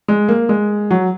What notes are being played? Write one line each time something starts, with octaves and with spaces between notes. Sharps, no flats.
G#3
A#3
G#3
F#3